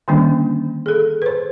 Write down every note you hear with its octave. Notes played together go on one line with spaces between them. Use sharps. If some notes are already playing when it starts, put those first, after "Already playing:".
D3 D#3 G3 A#3 C#4 D4
G#4 A4
B4 C5